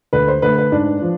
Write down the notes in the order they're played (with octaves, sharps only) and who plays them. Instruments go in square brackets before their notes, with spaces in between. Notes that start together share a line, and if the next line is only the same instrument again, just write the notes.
[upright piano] D2 B4
C5
D3 A3 B4
B4
G#2 D4
F3